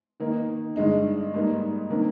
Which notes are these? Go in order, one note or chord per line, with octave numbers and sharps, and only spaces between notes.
D#3 A#3 D#4
G2 D3 G#3 D#4
G#2 G3 A#3 D#4
C3 D#3 G3 A#3 D4